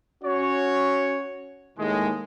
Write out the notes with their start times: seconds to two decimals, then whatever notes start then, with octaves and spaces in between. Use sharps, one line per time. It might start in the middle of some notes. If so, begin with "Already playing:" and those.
0.24 C#4 F#4 C#5
1.78 D#2 A2 G#3